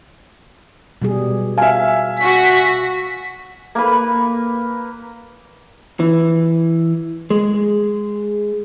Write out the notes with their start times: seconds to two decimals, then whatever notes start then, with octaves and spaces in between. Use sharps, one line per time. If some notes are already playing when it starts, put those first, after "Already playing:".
1.02 B2 G3 G#4
1.58 E5 F5 G#5
2.20 F#4 B6
3.75 A#3 B4
6.00 E3
7.30 G#3